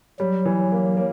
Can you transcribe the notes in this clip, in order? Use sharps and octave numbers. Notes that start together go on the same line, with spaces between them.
F#3 G3
E3
A#3
A#3